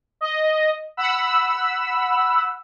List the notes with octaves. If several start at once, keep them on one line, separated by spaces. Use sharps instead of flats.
D#5
F#5 B5 E6